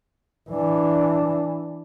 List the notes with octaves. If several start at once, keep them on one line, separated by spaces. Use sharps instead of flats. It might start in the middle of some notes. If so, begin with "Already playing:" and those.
E3 D4